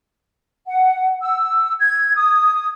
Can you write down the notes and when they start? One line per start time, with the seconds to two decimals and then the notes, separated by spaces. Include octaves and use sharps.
0.66 F#5
1.21 E6
1.79 G#6
2.16 D#6